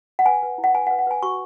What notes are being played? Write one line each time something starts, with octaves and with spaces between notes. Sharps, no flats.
F#5
B4 G#5
B4
E4
F#5
B4 G#5
F#5
B4
F#5
B4 G#5
F#4 C#6